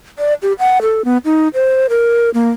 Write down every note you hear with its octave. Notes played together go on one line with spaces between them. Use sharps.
D5
G4
F#5
A4
B3
D#4
C5
A#4
A#3